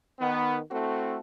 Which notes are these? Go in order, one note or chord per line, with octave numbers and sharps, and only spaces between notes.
D#3 B3
A3 C4 E4 F#4 A4